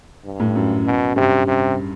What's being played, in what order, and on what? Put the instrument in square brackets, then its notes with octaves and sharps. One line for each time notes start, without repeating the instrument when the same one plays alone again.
[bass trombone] G2
[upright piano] A2
F#2
[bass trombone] B2
[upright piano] G2 [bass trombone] C3
[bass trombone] C3